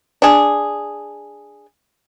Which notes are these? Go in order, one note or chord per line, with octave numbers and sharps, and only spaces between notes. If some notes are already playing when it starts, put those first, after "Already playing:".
D4 G#4